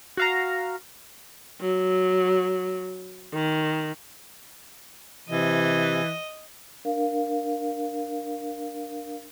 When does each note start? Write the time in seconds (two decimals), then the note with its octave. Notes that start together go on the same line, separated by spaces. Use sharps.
0.17 F#4 F5 A#5
1.61 F#3
3.33 D#3
5.29 C3 E3 D#5
6.85 D4 A#4 F5